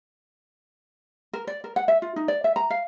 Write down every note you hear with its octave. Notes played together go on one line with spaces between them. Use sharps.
A#4
D5
A#4
F#5
E5
F4
D#4
D5
E5
A#5
F5